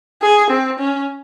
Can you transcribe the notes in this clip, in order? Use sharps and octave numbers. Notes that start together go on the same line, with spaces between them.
G#4
C4
C#4